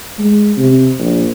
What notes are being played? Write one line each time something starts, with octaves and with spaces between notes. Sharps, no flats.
G#3
C3
A#1